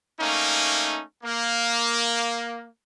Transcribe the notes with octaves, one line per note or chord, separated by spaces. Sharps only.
A3 A#3 C#4 D#4
A#3